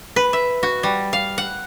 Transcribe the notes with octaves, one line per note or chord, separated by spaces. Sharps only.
B4
E5
F#4
G3
F5
F#5